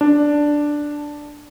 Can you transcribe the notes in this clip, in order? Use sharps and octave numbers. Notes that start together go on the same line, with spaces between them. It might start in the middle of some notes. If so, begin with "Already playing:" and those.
D4